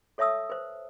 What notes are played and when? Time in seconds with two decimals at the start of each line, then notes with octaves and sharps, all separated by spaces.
0.18 A4 C#5 E5 A5 D#6 E6
0.50 B4 C5